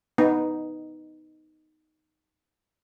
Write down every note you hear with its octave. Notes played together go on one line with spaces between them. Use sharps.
B3 D#4